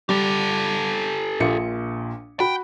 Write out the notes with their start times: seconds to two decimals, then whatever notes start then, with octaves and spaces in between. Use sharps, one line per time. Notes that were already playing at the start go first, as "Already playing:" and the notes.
0.09 G3 G4 A4
1.40 A#1 A#2 C#7
2.40 F#4 G5 B5